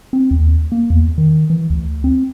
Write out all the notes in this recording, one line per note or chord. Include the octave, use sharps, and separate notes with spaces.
C4
D#2
A#3
E2
D#3
E3
D2
C4